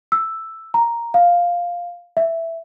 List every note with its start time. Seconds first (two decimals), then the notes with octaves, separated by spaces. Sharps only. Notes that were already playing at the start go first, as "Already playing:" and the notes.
0.12 E6
0.74 A#5
1.14 F5
2.17 E5